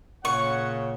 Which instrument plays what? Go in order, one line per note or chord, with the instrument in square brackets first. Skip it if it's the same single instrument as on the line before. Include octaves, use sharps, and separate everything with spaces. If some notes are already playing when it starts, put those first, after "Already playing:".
[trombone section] A#2 C#3 [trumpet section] C#5 F#5 [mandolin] C#6